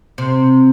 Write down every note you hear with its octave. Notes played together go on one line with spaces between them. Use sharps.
C3